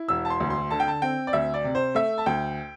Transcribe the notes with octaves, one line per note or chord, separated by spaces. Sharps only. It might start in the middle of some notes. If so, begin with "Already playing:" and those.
Already playing: E4
E1 E6
A5
C6
D2
C6
D3 A5
G5
A5
C4 G5
D5
D2 E5
D5
C3
C5
A3 E5
A5
D2 G5